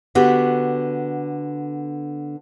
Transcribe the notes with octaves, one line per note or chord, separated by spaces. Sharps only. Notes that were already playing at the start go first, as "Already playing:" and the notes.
D3 B3 F#4 G4 F#5